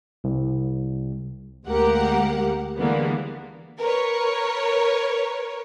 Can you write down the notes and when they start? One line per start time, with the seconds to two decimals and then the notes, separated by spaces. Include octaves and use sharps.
0.24 C2
1.67 D2 G#3 A#3 G4 A#4 F#5
2.79 D3 E3 G3 G#3 A#3 B3
3.79 A#4 B4 C#5